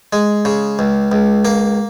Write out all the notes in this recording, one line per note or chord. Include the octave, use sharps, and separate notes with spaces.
G#3
C#3
C#2
C#2
A#3